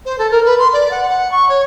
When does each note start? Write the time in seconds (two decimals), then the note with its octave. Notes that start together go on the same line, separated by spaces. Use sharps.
0.05 C5
0.18 A4
0.31 A#4
0.45 B4
0.59 C6
0.73 D5
0.91 F#5
1.09 F#5
1.31 C#6
1.49 C#5